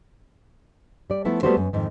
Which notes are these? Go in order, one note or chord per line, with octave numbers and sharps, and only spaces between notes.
G3 D5
F3 A3 B3 E4
G3 A3 B3 F4 F#4 C5
F#2
F2 G#2 D#3